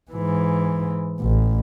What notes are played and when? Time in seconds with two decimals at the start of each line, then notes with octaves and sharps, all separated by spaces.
0.11 G#2 E3
1.20 A1